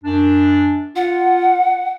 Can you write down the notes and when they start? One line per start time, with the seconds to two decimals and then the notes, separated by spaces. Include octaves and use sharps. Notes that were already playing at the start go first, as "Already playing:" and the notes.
0.03 F#2 D4
0.96 F4 F#5